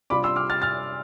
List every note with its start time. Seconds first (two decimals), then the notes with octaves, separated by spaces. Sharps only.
0.10 C3 G3 D4 F4 B5 D6
0.24 C6 E6
0.36 D6 F6
0.50 F6 A6
0.62 F6 A6